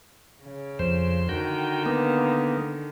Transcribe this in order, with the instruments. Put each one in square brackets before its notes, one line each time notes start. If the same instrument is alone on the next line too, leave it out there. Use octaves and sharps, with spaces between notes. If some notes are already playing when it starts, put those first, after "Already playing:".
[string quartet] C#3
[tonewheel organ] F2 C5
[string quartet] D3 D#3 [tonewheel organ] F#4 G5
[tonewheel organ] A#3 B3